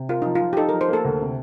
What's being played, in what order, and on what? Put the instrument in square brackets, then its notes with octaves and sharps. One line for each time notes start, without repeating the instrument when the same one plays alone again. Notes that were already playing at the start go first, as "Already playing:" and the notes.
Already playing: [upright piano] C3
[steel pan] F4 [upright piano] A#4
[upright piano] F3 [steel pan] D#4
[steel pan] F4
[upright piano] F3
[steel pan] G4
[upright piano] D#4 [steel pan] A4
[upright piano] F3 [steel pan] A#4
[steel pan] C5
[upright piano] A#3 [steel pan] A4
[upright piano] D2
C3